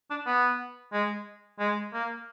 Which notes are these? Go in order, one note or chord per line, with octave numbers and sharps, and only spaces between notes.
D4
B3
G#3
G#3
A#3